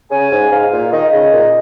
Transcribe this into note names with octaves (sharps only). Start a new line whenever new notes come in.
C#3 G#5
G#2
G#2 F5
A#2
D#3 D#5
C#3
A#2